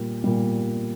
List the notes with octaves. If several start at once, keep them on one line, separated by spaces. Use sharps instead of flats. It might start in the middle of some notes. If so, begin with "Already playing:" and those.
Already playing: A#2 G3
A#2 G3